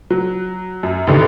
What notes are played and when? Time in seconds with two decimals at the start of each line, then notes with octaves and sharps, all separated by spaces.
0.10 F#3
0.83 F#2
1.07 A1 D#2 D3 D#3